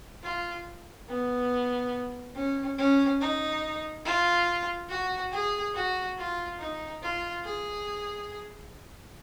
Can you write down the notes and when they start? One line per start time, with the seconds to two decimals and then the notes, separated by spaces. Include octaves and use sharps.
0.23 F4
1.09 B3
2.35 C#4
2.78 C#4
3.20 D#4
4.05 F4
4.90 F#4
5.32 G#4
5.74 F#4
6.18 F4
6.59 D#4
7.02 F4
7.44 G#4